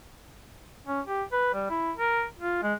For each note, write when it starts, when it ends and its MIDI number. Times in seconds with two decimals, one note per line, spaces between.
0.87 1.01 61
1.07 1.23 67
1.32 1.53 71
1.54 1.68 55
1.70 1.92 64
1.97 2.25 70
2.39 2.63 65
2.63 2.74 56